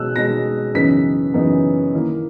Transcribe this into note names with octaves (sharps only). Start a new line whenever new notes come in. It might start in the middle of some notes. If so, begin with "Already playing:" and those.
Already playing: B2 G#3 D#4 E6 F#6
B2 G#3 D#4 A#6
F#2 C#3 E3 B3 D#4 B6
F#2 C#3 E3 B3 D#4
D#3 A#3 E4